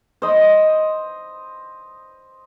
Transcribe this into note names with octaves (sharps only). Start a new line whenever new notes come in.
C5 D#5 B5